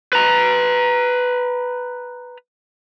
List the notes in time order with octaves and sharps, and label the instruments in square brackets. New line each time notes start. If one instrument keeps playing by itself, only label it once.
[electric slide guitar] B4 A#5